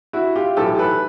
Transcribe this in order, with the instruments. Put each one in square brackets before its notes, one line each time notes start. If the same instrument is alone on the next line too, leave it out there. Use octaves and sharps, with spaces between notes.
[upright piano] E4 F#4
F4 G4
B1 A2 E3 G4 A4
A4 B4